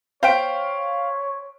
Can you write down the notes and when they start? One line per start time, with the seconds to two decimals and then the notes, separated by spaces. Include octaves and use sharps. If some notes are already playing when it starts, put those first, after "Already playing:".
0.23 C5 C#5 F5 G5 B6 D7